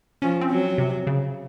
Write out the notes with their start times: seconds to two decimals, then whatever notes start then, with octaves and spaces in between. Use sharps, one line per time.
0.22 F3 C#4
0.41 C4
0.51 F#3
0.78 C3
1.07 C#3